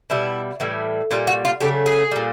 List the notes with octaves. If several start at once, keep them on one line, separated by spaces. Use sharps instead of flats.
B2 G3 E4
A2 E3 G3
A#2 G3 F4
F#4
F4
C#3 F#3 A3 G4
G#4
A#2 G3